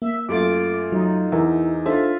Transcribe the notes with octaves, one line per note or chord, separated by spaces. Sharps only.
A#3 E5
F#2 A3 F4 D6
F#3 D#4
E2 E4 A#4 E5
D4 F4 A4 C5 E5